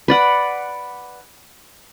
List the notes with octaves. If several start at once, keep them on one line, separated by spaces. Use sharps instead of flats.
B4 D5 F#5